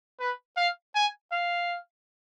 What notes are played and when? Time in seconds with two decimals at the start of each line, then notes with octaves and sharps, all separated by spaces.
0.20 B4
0.57 F5
0.95 G#5
1.33 F5